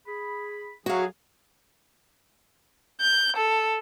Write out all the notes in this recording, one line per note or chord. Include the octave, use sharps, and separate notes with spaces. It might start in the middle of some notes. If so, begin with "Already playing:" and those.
G#4 B5
F#3 F#4 G#4 F5
G6
A4